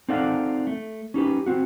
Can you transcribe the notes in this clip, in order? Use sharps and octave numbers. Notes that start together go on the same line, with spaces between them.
C4 D#4 A4 D5 F5 F#5
A3
C#4 D#4 G4 B4
C4 F#4